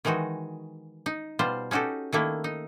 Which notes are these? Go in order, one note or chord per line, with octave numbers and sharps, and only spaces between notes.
D#3 E3 G#3 D#4 F#4
D#4
B2 G3 F4 C5
C#4 D#4 F#4 G4 A4
D#3 A3 A#3 E4
D#4